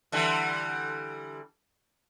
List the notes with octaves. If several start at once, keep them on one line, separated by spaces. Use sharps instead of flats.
D3 E3 G3